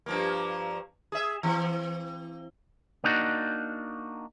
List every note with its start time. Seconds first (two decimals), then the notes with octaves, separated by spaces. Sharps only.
0.06 G2 F3 A#3
1.12 G#4 E5
1.43 E3 C4
3.04 A#3 D4 D#4 F#4